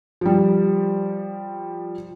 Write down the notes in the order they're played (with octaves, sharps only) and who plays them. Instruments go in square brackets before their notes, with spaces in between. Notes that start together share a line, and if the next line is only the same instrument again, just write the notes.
[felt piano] F3 G3